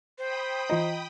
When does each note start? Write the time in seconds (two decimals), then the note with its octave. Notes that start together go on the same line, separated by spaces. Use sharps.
0.18 C5 G5 B5 D#6
0.70 E3 F4 D#5 A#5